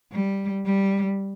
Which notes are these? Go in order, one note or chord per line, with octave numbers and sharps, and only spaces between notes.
G3
G3